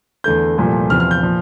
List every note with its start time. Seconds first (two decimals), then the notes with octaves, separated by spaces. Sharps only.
0.24 E2 D3 A3 G6
0.58 C2 A#2 F3 A3
0.89 E2 C3 F3 F6
1.00 F6
1.11 G6
1.22 A#2 F3